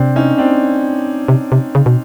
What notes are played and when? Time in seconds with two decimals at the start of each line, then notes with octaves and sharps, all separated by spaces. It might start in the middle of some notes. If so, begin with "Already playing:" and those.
Already playing: C3 C4 D4
0.16 C#4 D#4
0.38 C4 D4
1.28 C3
1.52 C3
1.75 C#3
1.86 B2